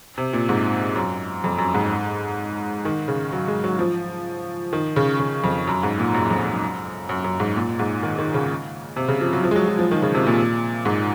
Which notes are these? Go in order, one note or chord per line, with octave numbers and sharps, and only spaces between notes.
C3
A#2
G#2
F#2
F2
F#2
G#2
D#3
C#3
F#3
G#3
F#3
F3
D#3
C#3
C#3
F2
F#2
G#2
A#2
F#2
F2
F#2
F#2
F#2
G#2
A#2
G#2
D#3
D#3
C#3
C3
C#3
F3
F#3
F3
G#3
F#3
F#3
F3
D#3
C#3
C3
A#2
G#2